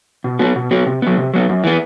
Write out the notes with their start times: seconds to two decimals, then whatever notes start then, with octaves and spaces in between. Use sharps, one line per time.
0.24 B2
0.39 F#3 B3 F#4
0.56 B2
0.71 F#3 B3 F#4
0.86 C3
1.02 F#3 B3
1.17 C3
1.34 F#3 B3
1.49 F#2
1.64 E3 B3